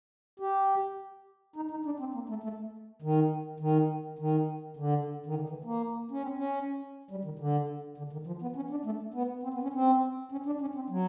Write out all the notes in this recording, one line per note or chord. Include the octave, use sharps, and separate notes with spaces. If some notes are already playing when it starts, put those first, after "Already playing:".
G4
D#4
D#4
D4
C4
A#3
A3
A3
D#3
D#3
D#3
D3
D#3
D3
E3
A#3
C#4
C4
C#4
G3
D#3
D3
D3
D#3
F3
B3
C#4
D4
A3
B3
C4
B3
C#4
C4
C#4
D4
C#4
C4
F#3